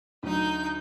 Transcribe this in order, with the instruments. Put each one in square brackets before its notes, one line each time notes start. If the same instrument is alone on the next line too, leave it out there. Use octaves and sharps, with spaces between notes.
[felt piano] D2 D3 F#3 [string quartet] D#4 G6